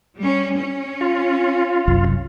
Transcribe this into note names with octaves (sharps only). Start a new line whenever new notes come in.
G3 C#4
C#4
F4
F#1 C2 F#2